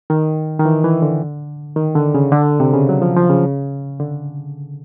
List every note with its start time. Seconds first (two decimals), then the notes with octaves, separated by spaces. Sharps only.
0.10 D#3
0.59 D#3
0.65 E3
0.84 E3
1.02 D3
1.76 D#3
1.95 D3
2.15 C#3
2.32 D3
2.60 C3
2.74 C#3
2.89 F#3
3.02 F3
3.17 F3
3.30 C#3
4.00 D3